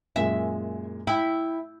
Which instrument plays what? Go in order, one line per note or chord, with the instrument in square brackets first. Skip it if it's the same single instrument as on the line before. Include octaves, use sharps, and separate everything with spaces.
[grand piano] F#2 A#2 G#3 [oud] E5
[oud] E4 [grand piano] G5